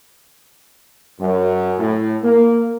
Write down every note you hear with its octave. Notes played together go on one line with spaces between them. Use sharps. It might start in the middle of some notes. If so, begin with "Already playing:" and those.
F#2
A2
A#3